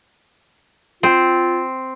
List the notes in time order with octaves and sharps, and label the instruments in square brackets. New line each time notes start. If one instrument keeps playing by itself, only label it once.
[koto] C4 [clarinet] F4